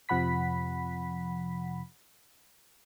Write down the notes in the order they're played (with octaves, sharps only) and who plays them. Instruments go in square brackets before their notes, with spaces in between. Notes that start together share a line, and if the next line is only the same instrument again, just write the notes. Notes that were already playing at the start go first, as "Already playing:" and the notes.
[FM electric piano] F2 C3 F3 F#5 B5 B6